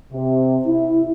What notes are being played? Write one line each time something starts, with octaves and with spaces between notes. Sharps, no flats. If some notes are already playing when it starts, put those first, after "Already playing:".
C3
E4